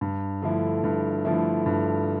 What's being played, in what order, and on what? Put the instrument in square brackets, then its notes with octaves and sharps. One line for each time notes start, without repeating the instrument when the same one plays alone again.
[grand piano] G2
D3 F3 A3 E4
G2
D3 F3 A3 E4
G2